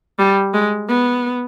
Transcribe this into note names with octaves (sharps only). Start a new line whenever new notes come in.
G3
G#3
B3